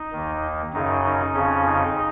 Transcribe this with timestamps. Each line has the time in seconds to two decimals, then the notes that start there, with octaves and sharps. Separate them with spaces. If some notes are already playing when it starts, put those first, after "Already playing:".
Already playing: D#4
0.13 D#2 D#3
0.73 F#2 C#3 D#4
1.04 D#4
1.34 F2 C#3 C#4
1.65 D#4